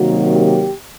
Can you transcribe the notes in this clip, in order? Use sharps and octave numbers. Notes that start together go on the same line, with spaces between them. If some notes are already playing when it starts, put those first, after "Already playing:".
Already playing: C3 D#3 F#3 A#3 F#4
G4